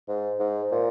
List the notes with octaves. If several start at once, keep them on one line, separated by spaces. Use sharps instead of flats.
G#2
G#2
A#2